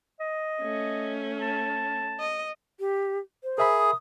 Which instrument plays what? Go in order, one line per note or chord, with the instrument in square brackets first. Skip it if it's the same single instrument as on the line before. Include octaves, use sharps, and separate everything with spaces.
[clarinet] D#5
[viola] A3 C#4
[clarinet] A5
[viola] D#5
[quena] G4
C5
[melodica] G#4 [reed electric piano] A#4 E5 B5
[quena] D#6